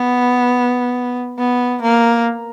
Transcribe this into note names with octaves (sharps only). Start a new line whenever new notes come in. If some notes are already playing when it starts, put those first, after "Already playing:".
Already playing: B3
B3
A#3